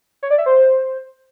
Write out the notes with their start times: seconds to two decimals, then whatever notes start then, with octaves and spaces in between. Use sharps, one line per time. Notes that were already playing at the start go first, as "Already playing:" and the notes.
0.23 C#5
0.30 D5
0.38 E5
0.46 C5